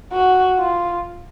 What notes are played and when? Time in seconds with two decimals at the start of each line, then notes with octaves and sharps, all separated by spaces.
0.12 F#4
0.58 F4